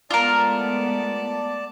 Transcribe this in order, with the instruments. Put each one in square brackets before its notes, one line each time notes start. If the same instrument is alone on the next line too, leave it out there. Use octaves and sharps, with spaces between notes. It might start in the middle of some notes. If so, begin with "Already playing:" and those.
[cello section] G#3 A3 B3 [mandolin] F4 A#4 [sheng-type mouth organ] D5 A5